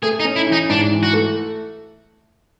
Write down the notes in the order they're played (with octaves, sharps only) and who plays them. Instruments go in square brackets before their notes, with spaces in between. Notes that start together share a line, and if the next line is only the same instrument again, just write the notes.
[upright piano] A3 [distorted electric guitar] G#4
[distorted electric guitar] D#4
[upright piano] C#4
[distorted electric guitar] E4
[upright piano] E3
[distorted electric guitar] D#4
[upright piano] G#2 [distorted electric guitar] D4
[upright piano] E3
[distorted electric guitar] F#4
[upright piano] A3